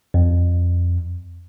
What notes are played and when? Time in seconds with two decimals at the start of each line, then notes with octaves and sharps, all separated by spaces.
0.14 F2